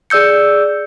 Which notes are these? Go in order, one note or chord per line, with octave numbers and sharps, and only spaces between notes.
G#4 D5 E6 G6 C#7